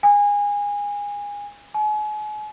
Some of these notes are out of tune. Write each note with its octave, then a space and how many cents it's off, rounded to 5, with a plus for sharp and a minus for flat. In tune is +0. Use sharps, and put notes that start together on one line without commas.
G#5 -25
G#5 +35